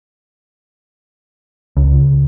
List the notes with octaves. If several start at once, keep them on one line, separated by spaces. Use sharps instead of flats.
C#2